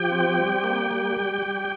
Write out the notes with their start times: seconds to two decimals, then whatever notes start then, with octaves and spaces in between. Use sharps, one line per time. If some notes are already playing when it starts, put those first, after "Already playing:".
Already playing: F3 G4 G5
0.11 C4
0.38 G3
0.64 A#3
0.91 G3
1.17 G3
1.42 G3